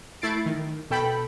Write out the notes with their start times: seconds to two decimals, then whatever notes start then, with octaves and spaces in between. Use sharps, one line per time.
0.22 A3 E4 A6 C7 D7
0.46 D#3
0.90 B2 A4 G5 B5